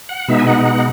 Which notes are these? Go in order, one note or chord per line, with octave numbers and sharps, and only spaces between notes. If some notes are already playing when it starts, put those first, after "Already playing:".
F#5
B2 G#3 B3 D#4 E5
G#5
F#5
F#5